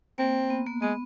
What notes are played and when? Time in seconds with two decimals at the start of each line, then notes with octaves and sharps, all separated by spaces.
0.18 A#3 C4
0.50 B3
0.66 A#3
0.82 G#3 B3